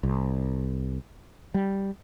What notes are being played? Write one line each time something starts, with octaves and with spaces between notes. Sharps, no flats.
C2
G3